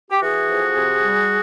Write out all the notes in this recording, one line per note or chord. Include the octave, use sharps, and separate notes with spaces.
G4
E3 F#4 G#4
F2
C3
G3